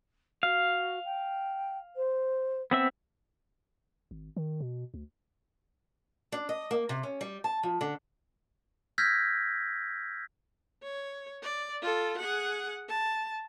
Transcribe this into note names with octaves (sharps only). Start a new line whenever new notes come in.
F#4 F5
G5
C5
B3 C4 E5
G#1
D#3
B2
D2
D4
D#5
A#3
C3
C#4
G3
A5
F3
D3
E6 F6 G6 G#6 A#6 B6
C#5
D5
F4 A4
G#4 F#5
A5